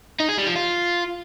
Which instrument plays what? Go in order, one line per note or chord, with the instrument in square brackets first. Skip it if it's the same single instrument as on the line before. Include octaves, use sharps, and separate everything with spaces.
[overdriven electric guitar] D#4
G#4
G3
F3
F4